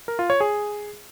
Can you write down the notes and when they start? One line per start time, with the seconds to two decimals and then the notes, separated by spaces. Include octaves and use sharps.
0.08 A#4
0.19 F4
0.30 C#5
0.40 G#4